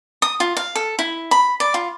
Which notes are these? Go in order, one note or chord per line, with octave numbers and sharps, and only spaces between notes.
D#6
F4
F5
A4
E4
B5
D5
F4